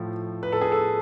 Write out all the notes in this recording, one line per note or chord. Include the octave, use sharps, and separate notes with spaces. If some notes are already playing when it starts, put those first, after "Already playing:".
Already playing: A2 F3
B4
A4
G#4
A4